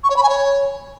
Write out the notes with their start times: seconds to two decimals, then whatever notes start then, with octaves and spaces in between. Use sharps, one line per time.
0.04 C#6
0.10 C#5
0.17 B5
0.23 G#5
0.29 C#5